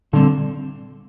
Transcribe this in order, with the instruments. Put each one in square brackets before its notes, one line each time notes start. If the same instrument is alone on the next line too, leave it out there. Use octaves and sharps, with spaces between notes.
[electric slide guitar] A#2 G3 C4 [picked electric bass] D3